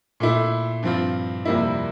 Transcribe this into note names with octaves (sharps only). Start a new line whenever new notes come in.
A#2 A3 E4
G2 F3 C4 F4
F2 C3 G3 A#3 E4